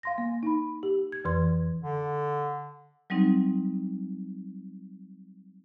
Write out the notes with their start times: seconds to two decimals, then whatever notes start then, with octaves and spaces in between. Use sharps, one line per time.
0.03 F5 C6 A#6
0.18 A#3
0.43 D#4 B5
0.83 G4
1.12 G#6
1.24 F2 E3 B4 C6 G#6
1.83 D3
3.10 F#3 G3 C4 D#4